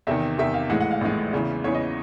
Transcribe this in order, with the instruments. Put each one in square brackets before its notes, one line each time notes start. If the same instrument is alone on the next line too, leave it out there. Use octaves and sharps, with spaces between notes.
[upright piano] E2 C3 D#3 E5
E2 C3 D#3 E5
F5
A#1 A2 E3 G#3 F#5
F#5
F5
A#1 A2 E3 G#3
E2 C#3 E3
E2 C#3 E3 C#5
D#5